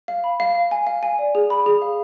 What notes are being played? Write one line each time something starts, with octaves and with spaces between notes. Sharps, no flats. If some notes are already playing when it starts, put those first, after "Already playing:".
F5
B5
F5
F5
G#5
F5
G#5
D5
G#4
B5
G#4
F5